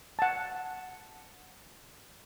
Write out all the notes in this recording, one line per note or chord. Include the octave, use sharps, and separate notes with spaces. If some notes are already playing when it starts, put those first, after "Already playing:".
F#5 A5